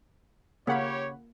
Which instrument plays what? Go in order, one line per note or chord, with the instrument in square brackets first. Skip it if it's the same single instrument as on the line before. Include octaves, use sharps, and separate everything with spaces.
[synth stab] C#3 F#5 B5 [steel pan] A#3 [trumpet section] G4 C#5